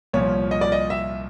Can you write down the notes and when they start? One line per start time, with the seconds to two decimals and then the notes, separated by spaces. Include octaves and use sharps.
0.14 C2 A#2 F3 C#5
0.51 D#5
0.61 D5
0.72 D#5
0.90 E5